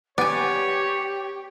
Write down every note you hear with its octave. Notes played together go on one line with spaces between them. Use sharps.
B3 G4 C#5 D5 G#5